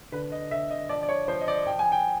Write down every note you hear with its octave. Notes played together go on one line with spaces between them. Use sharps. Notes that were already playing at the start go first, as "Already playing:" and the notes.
D3 B4
D#5
D3 E5
D#5
F3 D5
D5
C#5
F3 C5
D#5
D5
F3 G5
G#5
G5